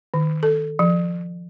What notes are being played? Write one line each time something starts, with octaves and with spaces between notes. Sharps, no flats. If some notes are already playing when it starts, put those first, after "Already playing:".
D#3
A4
F3